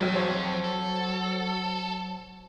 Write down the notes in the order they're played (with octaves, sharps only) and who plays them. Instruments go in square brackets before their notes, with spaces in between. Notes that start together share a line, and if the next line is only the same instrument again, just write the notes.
[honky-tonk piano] B1 E2 F#3 [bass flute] G#4 [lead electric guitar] A4 G5
[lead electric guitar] F2 [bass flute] F#3 [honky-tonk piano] C5 C#5
[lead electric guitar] A4